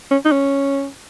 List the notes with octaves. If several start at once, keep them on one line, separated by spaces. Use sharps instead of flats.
C#4
D#4
C#4